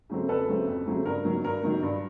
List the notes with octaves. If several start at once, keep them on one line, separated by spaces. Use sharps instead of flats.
C#3 F#3 A3 C4
F2 A4 B4
C#3 F#3 A3 C4
F2
C#3 F#3 A3 C4
G2 A#4
D#3 F#3
G2 A#4
D#3 F#3
G2